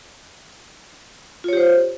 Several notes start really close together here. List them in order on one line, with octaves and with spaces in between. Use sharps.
F4 C#5 G4 C5